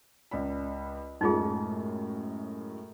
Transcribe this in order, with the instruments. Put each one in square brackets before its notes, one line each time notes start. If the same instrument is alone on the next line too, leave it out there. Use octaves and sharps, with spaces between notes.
[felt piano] C#2 D5 B5
[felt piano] F#2 A2 G#3 [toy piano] D#4 F4 G#4